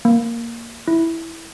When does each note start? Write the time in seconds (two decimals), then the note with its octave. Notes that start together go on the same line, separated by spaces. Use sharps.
0.05 A#3
0.88 E4